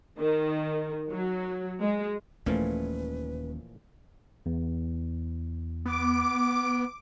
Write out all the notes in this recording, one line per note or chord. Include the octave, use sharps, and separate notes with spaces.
D#3
F#3
G#3
D#1 D#2 A#2 E3 F3 A3 C#4 B4
E2
B3 D6